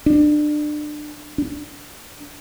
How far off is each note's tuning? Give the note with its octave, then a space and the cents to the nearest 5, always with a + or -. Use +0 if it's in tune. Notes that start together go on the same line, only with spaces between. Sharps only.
D4 +30
D4 -10